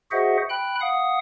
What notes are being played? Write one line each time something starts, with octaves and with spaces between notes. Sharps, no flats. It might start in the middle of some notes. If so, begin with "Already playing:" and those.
F#4 G#4 C5 D#5 E5 F#5
G5 B5 F#6
F5 F#5 D#6